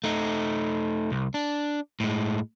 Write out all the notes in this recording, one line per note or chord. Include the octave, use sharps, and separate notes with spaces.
A3 D#4
C2
D4
A2 G#3